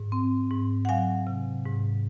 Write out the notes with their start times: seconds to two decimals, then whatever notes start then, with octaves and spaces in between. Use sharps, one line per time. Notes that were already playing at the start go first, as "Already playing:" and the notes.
Already playing: G#2
0.12 C4
0.50 G#2
0.85 F#5
0.89 F#3 F5 G#5
1.27 C3
1.66 G#2